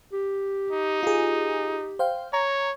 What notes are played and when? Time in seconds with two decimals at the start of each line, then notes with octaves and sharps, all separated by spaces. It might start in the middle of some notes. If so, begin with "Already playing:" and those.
0.13 G4
0.71 D#4
1.03 F4 G4 G#4
1.99 C5 F5 G5
2.33 C#5 A#5